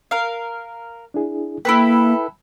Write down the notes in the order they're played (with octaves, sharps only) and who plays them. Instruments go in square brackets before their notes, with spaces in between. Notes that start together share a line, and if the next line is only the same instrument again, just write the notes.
[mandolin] A#4 F5
[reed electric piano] D4 E4 G#4
[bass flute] A#3 [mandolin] E4 A4 B4 [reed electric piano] G5 B5